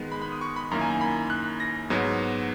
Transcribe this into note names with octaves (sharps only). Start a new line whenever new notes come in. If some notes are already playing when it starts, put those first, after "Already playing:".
Already playing: D#3 G#3 B3
B5
B5
D#6
C#6
B5
F#2 D#3 A#3 E4 A#5
G#5
A#5
B5
F#6
A#6
G#2 F#3 B3